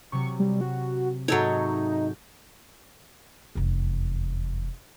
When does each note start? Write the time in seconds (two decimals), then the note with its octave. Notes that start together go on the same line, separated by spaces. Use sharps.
0.12 C3 F#3 C#6
0.39 G3
0.61 F#4
1.28 G#2 F#3 D#4 A4 C#5 E5 G6
3.55 F1 E2